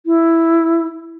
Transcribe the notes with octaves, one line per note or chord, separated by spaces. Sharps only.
E4